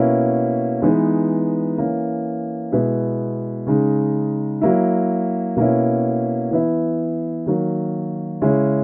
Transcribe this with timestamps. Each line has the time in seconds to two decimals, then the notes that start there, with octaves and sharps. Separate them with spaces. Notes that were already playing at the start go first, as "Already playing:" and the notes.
Already playing: B2 A#3 C#4 E4
0.82 E3 G#3 B3 D#4
1.77 E3 A#3 C#4
2.72 B2 G#3 B3 E4
3.67 C#3 G#3 D#4
4.61 F#3 A#3 E4
5.56 B2 A#3 C#4 E4
6.51 E3 B3 E4
7.46 D#3 F#3 A#3
8.41 C#3 G#3 C#4 E4